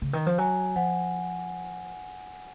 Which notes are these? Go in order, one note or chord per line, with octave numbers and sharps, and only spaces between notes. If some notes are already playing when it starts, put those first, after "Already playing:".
C#3
D#3
F3
F#3 G#5
F3 F#5